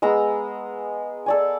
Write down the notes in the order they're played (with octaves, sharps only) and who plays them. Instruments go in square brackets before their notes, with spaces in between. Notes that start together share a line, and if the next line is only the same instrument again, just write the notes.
[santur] G#3 B3 A#5 E6
A4 D5 G#5